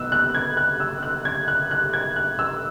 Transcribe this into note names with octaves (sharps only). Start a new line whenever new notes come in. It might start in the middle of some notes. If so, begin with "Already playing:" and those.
Already playing: B2 B3 E6 F#6
F#6
G#6
F#6
E6
F#6
G#6
F#6
F#6
G#6
F#6
E6